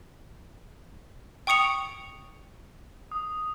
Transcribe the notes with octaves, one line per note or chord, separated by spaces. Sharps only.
G5 C#6 D#6 C#7 F7
D#6